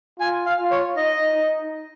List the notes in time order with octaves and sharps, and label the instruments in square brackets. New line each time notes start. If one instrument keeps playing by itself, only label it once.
[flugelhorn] F4 [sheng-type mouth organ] G#5
[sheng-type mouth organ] F5
[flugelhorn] F4
[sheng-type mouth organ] C#5
[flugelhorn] D#4 [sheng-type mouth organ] D#5
[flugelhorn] D#4